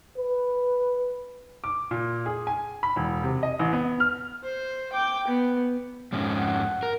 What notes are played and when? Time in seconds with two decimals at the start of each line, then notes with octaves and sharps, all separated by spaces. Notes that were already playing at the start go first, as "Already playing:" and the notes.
0.18 B4
1.64 D6
1.91 A#2
2.26 G#4
2.47 G#5
2.83 B5
2.96 E1
3.23 C3
3.43 D#5
3.59 A1
3.73 B3
4.00 F6
4.44 C5
4.93 G5 D6
5.27 B3
6.12 F2 G#2 C#4
6.39 F#5
6.83 A#4